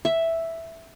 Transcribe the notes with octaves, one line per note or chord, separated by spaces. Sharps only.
E5